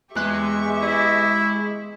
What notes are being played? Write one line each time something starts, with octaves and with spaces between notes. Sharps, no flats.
E2 G#3 G4 E5 C#6 F#6
E4 D#5